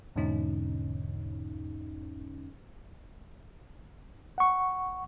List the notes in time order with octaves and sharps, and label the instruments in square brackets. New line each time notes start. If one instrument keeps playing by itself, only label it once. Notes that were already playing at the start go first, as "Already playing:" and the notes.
[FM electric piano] E2 G#2 B2 D3 C#4 D#4
[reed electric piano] F#5 C#6